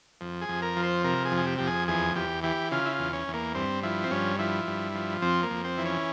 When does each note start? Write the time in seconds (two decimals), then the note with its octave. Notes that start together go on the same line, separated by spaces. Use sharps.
0.21 F2
0.42 G#4
0.49 F2
0.62 A#4
0.76 F3
0.83 C5
1.04 C3 A#4
1.25 G#4
1.32 F2
1.37 G#4
1.47 G4
1.58 F2 G4
1.67 G#4
1.88 E2 G#4
2.15 E2 G4
2.43 E3 G4
2.71 C#3 F4
2.85 E4
2.93 F4
2.99 E2
3.13 C#4
3.28 E2
3.34 A#3
3.55 G2 C4
3.83 F3 E4
4.04 C4
4.11 G2 C#4
4.39 F3 E4
4.67 G2
4.95 F3
5.22 F2 C4
5.43 A#3
5.50 F2
5.64 C4
5.78 E3
5.85 C#4